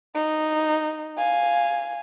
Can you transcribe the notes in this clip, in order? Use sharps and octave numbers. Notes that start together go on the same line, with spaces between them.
D#4
F5 G#5